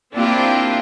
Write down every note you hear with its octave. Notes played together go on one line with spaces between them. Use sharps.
A#3 C4 D4 E4 F4 G4